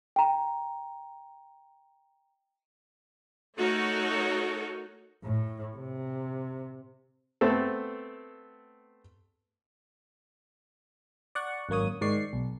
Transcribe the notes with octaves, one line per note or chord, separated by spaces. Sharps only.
G5 A#5
A3 D#4 F#4 A4 A#4 C#5
A2
C3
A3 B3 C4 A4
D5 F#5 C#6
G#1 F#2 A#3 C#5 D#6
G#2 D#3 D5 C#6 C7
B1